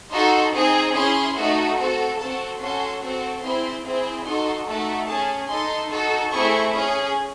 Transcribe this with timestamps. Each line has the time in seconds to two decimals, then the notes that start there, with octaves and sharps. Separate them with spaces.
0.12 D#4 F#4 A4 C6
0.54 C4 D#4 G#4
0.95 C#4 E4 G#4 C6
1.37 A3 D#4 F#4 A4
1.78 C4 F#4 A4
2.19 C4 F#4 A4 A5
2.60 C#4 F#4 A4 C6
3.02 C4 F#4 A4
3.43 C4 E4 G#4 C6
3.85 C4 E4 G#4
4.26 D#4 F#4 A4 C6
4.68 A3 D#4 F#4 A4
5.08 C#4 G#4 A5
5.50 D#4 A4 C6
5.91 D#4 F#4 A4
6.32 A3 C4 E4 G#4 C#6
6.74 C#4 G#4